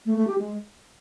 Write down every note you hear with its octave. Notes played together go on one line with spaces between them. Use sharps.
A3
A3
G4
G#3